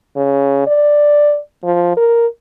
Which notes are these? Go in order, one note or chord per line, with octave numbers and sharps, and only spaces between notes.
C#3
D5
F3
A#4